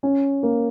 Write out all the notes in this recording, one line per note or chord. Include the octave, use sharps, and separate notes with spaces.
C#4
A#3